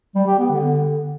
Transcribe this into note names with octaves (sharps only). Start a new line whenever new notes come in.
G3
G4
B3
D3